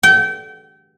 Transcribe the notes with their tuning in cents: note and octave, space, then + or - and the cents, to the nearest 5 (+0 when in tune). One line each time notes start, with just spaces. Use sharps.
G5 -30